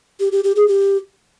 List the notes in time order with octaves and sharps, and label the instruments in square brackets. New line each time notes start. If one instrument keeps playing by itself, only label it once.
[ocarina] G4
G4
G4
G#4
G4